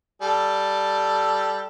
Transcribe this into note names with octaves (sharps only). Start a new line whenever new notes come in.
G3 A4